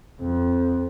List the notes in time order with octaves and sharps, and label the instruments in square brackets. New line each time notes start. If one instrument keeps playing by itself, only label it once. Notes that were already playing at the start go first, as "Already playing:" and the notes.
[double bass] F2 [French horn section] C4